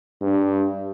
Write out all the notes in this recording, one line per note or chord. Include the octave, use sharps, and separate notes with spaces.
G2